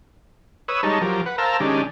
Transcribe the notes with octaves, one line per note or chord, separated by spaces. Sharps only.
B4 C#5 D#6 E6
G3 G#3 D#4 C#5 A5 A#5
F3 F#3 G4 A#4
B4 F#5
A#4 C5 F5 A5 A#5 E6
D#3 G#3 C#4 D4 G4